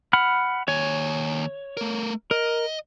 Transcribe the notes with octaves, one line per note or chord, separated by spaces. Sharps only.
F#5 B5 F6
D#2 C#5 G#5
A3 A#4
A#4 D#5